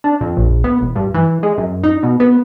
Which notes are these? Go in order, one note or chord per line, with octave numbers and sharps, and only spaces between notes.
D4
F2
A#1
B3
E1
G2
E3
G#3
F#2
D#4
B2
B3